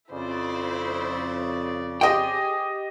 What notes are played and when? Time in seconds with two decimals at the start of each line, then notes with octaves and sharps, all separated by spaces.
0.11 F2 C#3 E4 C5 D5
2.01 G4 G#4 C5 D#5 G5 D6